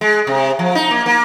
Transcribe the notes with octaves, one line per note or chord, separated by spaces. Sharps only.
G#3
C3
F3
D#4
A#3
A#3